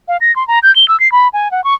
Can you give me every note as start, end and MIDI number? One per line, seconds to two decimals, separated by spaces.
0.08 0.17 77
0.21 0.34 94
0.36 0.46 84
0.48 0.59 82
0.63 0.74 91
0.76 0.87 103
0.88 0.99 88
1.00 1.10 96
1.12 1.28 83
1.33 1.51 80
1.51 1.63 78
1.64 1.74 85